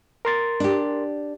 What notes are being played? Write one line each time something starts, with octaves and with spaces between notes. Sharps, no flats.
A#4 C6 A6
D4 G4